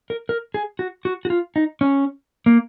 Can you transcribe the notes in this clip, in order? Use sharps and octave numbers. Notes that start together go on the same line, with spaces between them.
A#4
A#4
G#4
F#4
F#4
F#4
F4
D#4
C#4
A#3